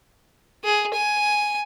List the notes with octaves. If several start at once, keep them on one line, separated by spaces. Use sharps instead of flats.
G#4
G#5